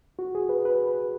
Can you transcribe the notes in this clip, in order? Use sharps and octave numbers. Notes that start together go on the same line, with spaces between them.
F#4
G#4
B4
B4